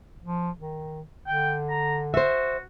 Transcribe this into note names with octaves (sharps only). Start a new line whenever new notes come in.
F3
D#3
D3 G5
A#5
F#4 C5 E5